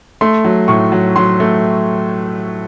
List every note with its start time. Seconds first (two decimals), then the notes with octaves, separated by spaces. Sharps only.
0.21 A3 C6
0.44 F#3
0.68 A2 C#6
0.92 F#3
1.16 F#3 C6
1.40 A3